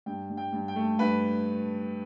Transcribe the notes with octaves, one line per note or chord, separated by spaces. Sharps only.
G2 G5
G2
G5
G2
G5
A3
G2 B4